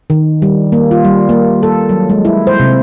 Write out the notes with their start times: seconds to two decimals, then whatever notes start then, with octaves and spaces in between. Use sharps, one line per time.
0.10 D#3
0.42 G3
0.72 A#3
0.91 F4
1.05 G3
1.29 A#3
1.63 A4
1.89 F#3
2.10 G#3
2.25 E4
2.47 C5
2.60 C3